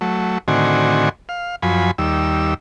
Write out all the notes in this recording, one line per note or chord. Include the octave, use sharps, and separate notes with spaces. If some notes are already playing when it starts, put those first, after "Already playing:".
F#3 A3
A2 D3 D#3 C4 F#4 G#5
F5
F#2 F3 G#5 B5
D#2 G3 E6